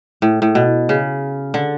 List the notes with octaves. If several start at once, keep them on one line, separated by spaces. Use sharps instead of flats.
A2
A2
B2
C#3
D3